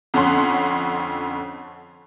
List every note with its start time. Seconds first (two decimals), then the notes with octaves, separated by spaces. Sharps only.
0.14 F2 D3 C#4 F#5 C6